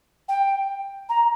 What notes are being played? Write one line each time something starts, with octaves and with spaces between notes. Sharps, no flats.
G5
A#5